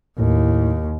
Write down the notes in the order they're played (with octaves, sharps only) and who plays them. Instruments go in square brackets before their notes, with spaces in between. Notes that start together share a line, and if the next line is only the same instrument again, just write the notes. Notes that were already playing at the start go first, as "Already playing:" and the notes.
[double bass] D#2 [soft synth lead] A2